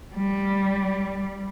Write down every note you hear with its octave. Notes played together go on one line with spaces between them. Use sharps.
G3